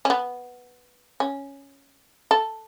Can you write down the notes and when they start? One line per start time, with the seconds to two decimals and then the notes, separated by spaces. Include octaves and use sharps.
0.05 C#4
0.10 B3
1.20 C#4
2.31 A4